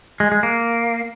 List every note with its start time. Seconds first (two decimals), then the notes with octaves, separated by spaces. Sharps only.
0.20 G#3
0.32 G#3
0.43 A#3